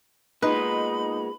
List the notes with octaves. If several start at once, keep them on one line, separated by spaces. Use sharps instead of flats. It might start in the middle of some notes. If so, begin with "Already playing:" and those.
A#2 G#3 B3 D#4 B4 B5